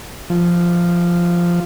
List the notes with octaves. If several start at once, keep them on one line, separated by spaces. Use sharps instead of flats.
F3